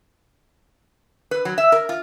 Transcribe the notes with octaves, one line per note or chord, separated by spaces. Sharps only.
B4
F#3
E5
A#4
F4